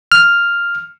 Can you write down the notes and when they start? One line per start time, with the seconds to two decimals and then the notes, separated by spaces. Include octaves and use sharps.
0.12 F6